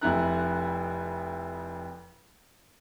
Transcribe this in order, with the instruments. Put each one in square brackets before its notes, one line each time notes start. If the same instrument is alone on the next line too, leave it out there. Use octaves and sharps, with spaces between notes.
[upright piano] F1 F2 E4 A#5 F#6